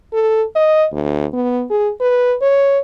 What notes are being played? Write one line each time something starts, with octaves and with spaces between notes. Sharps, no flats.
A4
D#5
D2
B3
G#4
B4
C#5